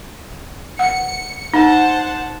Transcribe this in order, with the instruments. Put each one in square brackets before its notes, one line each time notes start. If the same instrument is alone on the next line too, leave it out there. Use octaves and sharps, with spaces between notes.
[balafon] F#5 [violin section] C#7
[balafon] D#4 [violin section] C5 F#5 A5